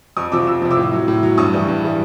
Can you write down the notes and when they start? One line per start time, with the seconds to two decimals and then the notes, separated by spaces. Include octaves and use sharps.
0.17 F2 C#6 D#6
0.32 C3 F3 D6 E6
0.47 F2 E6
0.62 C3 F3
0.71 D6 E6
0.77 A2
0.93 F#3
1.08 A2
1.23 F#3
1.37 G2 C#6 D#6
1.53 E3 G3
1.68 G2
1.84 E3 G3